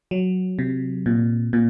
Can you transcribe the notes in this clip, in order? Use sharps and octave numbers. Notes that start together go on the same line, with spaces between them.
F#3
C3
A#2
A#2